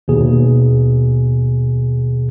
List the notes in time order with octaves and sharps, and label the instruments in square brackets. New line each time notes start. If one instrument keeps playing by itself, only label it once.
[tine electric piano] D#2 B2 G#4